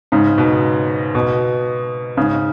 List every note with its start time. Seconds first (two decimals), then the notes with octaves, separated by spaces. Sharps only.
0.12 G#2 C#3
0.38 B2
1.15 B2
2.17 G#2 C#3